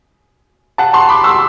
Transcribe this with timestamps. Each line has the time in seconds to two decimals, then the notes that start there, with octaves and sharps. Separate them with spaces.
0.78 F#5 A5
0.93 A5 C6
1.09 B5 D6
1.24 C6 E6